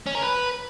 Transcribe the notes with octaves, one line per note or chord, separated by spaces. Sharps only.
C#4
A#4
B4